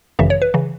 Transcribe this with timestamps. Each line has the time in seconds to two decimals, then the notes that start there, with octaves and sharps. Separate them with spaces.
0.19 G#1 F#2 C#3 E3 E5
0.30 C#5
0.42 B4
0.54 C#3 E3